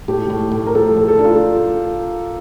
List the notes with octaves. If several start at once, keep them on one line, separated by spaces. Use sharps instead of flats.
A2 G4
A2
A2
A#4
F3 A4
A2
A4
D4
F4